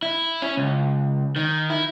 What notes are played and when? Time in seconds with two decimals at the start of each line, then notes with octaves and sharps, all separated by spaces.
0.03 E4
0.42 C#4
0.57 C#2
1.36 D#3
1.70 E4